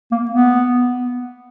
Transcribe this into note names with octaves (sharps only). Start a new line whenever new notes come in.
A#3
B3